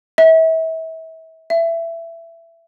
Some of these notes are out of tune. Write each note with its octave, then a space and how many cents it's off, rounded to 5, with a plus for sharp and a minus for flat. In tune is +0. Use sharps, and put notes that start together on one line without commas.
E5 -35
E5 +20